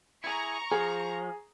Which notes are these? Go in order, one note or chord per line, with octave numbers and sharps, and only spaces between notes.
E4 G#4 A#5 C#6
F3 G#4